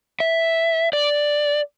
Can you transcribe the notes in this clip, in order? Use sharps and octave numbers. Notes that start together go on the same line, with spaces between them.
E5
D5